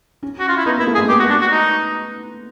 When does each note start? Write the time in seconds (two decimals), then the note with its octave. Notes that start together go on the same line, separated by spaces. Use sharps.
0.23 C#4
0.40 F#4
0.49 F4
0.57 E4
0.66 B3 D#4
0.77 A#3 E4
0.87 A3
0.95 G#4
0.98 G#3
1.09 B3 G4
1.20 F#4
1.30 D4
1.41 F#4
1.51 D#4